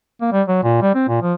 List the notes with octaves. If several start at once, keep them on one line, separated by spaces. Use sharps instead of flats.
A#3
G3
F#3
A#2
G3
C4
A#2
F3